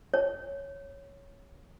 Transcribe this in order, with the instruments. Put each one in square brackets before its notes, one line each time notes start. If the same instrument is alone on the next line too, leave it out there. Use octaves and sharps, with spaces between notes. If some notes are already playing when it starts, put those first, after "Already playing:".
[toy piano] C#5